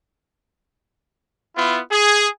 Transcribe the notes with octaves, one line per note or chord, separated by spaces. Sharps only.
B3 E4 F4
G#4